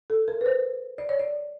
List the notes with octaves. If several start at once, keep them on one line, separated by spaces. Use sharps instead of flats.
A4
A#4
B4
C5
D5
C#5
D5